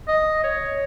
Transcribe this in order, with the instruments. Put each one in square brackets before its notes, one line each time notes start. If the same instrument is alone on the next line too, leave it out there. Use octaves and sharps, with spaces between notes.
[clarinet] D#5
C#5